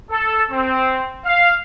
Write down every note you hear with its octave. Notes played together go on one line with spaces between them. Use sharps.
A4
C4
F5